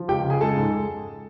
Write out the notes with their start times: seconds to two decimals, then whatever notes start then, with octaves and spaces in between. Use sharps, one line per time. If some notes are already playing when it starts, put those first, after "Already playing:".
Already playing: F3
0.08 C#2 G4 G5
0.24 C#3
0.30 G#4 G#5
0.41 G#3 A4 A5
0.57 G#2